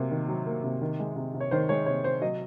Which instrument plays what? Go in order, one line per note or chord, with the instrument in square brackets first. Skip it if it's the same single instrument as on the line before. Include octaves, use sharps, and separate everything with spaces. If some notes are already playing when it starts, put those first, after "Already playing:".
Already playing: [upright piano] C3 F#3 A#3
D#3
F#3
A#3
C3
D#3
G#3
C3
C3
C#5
D#3 C5
G#3 C#5
C3 C#5
C3 C5
F#3 D#5